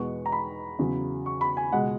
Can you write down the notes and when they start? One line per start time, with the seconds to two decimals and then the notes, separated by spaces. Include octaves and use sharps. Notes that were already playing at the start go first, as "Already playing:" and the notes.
Already playing: E2 B2 G#3 B3 C#6
0.26 A#5
0.32 B5
0.79 E2 C#3 F#3
1.26 C#6
1.41 B5
1.57 G#5
1.72 C#2 B2 G#3 F#5